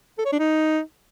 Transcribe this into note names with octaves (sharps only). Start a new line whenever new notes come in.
A4
C#5
D4
D#4